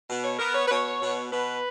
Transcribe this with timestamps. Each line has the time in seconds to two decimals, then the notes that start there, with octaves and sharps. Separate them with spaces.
0.09 B2
0.23 C#5
0.39 B3 A#4
0.54 C#5
0.66 B4
0.70 B2 C#5
1.01 B2
1.32 B2 B4